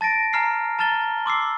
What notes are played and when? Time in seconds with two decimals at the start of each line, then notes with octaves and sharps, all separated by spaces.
0.01 A5 A6 A#6 D7
0.33 G#5 A#5 F6 C7
0.79 A5 A#5 F6 A6 G7
1.26 C6 D6 E6 C7